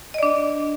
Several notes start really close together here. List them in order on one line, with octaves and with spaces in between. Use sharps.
D#5 D5 D4